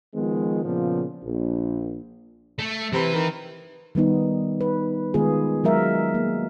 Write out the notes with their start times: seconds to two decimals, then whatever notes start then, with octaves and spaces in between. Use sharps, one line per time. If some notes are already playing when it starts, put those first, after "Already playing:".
0.15 D#3 F3 G#3 B3
0.64 A#2 C#3 F3 B3
1.23 A#1
2.59 A3
2.93 C3 E3 B4
3.14 D#3
3.95 D#3 G3 B3 D#4
4.61 B4
5.14 D#3 G#3 B3 F4 G#4
5.64 F#3 G#3 A#4 E5 F5
6.14 A#3